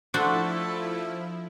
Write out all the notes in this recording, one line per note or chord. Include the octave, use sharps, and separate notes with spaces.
F3 A3 D4 E4 F#4 A4 C5